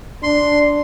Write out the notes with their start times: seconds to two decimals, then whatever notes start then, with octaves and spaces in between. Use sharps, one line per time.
0.23 D4 C6